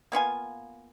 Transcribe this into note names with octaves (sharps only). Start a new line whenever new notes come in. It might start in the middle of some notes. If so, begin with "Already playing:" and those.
A#3 B3 F4 G#5